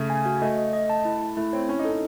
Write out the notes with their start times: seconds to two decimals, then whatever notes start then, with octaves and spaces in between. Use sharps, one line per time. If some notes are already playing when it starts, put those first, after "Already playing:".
Already playing: C#3 A3
0.10 G#5
0.26 F#4
0.42 A3 D#5
0.58 D#5
0.73 D#5
0.90 A5
1.05 E4
1.22 E4
1.37 A3 E4
1.53 C4 C#5
1.68 C#4 E4
1.79 D#4
1.85 C#4 A4